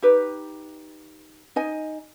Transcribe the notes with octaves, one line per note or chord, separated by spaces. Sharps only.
D#4 G4 B4
D#4 D#5 G#5